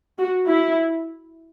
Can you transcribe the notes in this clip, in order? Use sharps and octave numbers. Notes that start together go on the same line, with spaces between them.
F#4
E4